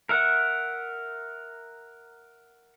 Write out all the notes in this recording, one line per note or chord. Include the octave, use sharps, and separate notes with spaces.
A#4 E5 F#5